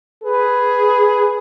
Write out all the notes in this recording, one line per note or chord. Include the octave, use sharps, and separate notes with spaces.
G#4 B4